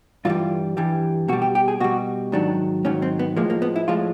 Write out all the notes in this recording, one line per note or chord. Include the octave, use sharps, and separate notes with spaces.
G2 E3 G3 F4
G2 E3 G3
B2 G3 F#4
G4
G4
G#4
B2 G3 F#4
G#2 D#3 F#3 D4
G#2 D#3 F#3 C#4
C4
B3
A2 F3 G#3 A#3
A#3
B3
E4
A2 F3 G#3 F4